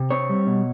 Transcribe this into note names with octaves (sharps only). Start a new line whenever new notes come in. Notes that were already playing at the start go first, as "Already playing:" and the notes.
Already playing: C3
C4 C#5
G3
B2